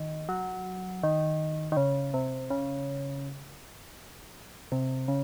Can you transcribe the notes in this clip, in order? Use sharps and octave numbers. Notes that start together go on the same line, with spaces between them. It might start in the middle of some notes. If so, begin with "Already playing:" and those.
Already playing: D#3
F#3
D#3
D#3
C#3
C3
C#3
C3
C#3